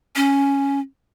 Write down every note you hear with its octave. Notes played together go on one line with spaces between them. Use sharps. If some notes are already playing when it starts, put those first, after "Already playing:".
C#4